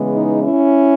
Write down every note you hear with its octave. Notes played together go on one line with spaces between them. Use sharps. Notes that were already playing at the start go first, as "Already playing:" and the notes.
Already playing: C#3 E3 G#3 B3
D#4
C#4 E4